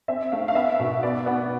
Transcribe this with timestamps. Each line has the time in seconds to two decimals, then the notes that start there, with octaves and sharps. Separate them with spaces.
0.08 C4 E5
0.32 A3 F5
0.48 F5
0.55 B3 E5
0.79 B2
1.03 B3 D5
1.26 B3